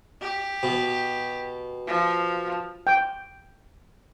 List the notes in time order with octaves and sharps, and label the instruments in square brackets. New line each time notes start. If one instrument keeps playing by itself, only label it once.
[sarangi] G4
[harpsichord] B2
[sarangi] F3
[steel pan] G5